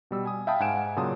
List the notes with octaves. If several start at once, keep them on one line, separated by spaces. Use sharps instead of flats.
B2 G3 E6
G#5 D#6
E5 F5 G5 A5 B5 D#6
G#2 F#5 G#5 F#6 D7 E7
A#2 C#3 F#3 A5 C6 D#6